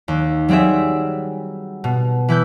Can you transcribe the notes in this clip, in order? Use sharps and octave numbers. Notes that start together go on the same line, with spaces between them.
D#2
F#3 G3 C4 G#4 E5
B2
E3 E4 B4 G6